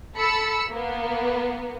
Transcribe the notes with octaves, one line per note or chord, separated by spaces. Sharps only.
A4 B5 E6 C#7
A#3 B3